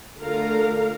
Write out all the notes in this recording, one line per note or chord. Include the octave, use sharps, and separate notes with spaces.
D3 A3 F4 A#4 F5 A#5